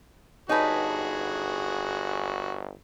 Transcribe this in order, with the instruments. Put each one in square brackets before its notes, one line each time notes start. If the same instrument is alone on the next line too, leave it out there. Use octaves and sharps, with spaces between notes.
[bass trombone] G1 [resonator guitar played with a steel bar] D#4 B4 [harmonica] F#4 G#4 [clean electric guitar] C#5 G#5 A5